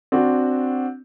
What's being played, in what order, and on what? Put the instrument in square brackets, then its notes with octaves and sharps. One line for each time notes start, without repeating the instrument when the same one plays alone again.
[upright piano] C4 D4 F#4